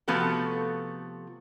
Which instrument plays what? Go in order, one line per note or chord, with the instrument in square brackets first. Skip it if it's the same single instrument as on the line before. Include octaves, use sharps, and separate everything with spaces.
[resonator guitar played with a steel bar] C3 F3 A3 B3 F#4 A4